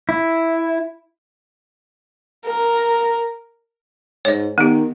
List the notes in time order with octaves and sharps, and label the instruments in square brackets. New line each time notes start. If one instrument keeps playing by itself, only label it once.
[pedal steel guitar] E4
[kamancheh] A#4
[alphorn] G#2 [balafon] C#5 D#5
[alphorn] D#3 [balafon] B3 G4